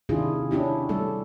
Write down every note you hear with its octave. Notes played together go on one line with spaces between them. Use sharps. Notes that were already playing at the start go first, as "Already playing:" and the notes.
C3 D#3 D4 E4 F4 G#4
C#4 D4 E4 G4
G3 A3 A4